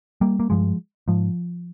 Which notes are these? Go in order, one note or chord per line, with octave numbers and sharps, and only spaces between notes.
G3 A#3
A#3
G2 F3 G#3
G#2 F3